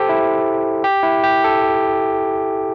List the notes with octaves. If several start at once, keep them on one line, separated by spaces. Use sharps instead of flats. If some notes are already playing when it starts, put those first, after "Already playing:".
Already playing: G4 A4 C5
E4
G4
E4
G4
A4